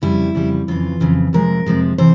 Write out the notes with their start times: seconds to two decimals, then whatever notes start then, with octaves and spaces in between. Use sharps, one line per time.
0.02 F2 C#3 G3 E4
0.35 F2 C#3 G3
0.68 F2 C#3 E3 F4
1.00 F2 C#3 E3
1.33 F2 C3 F3 G#3 A#4
1.66 F2 C3 F3 G#3
1.98 C3 E3 C5